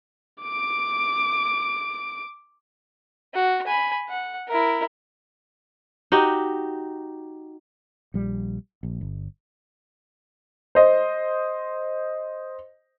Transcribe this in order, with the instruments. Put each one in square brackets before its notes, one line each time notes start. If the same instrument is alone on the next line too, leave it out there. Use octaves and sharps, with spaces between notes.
[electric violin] D6 D7
[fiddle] F#4
G#5 B5
F#5
E4 A#4
[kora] D#4 F#4 G4 D#5
[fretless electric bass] A#1 G3
A#1
G1
[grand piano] C5 D#5